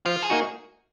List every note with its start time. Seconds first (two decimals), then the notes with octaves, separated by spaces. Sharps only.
0.06 F3 F4
0.22 G#4
0.30 A#3 D#4 F#4